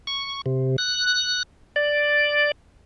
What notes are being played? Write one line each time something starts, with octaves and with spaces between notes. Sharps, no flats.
C#6
C3
F#6
D5